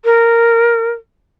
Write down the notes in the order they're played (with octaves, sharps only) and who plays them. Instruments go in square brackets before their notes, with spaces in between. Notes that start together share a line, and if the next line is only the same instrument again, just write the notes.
[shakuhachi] A#4